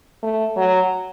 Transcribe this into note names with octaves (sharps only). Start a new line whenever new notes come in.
A3
F#3